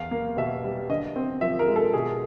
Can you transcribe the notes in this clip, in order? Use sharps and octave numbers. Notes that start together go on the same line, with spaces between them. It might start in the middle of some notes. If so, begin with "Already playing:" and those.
Already playing: E2 F5
A#3
B2 E5
G3
D3 D#5
C4
F3 E5
A#4
G#3
A4
B2 G#4